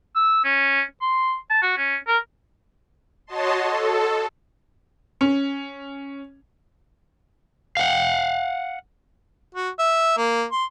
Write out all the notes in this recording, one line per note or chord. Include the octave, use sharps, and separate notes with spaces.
E6
C#4
C6
A5
F#4
C#4
A#4
F#4 C#5 D#5 A5 C6
A4
C#4
F5 F#5
F#4
E5
A#3
C6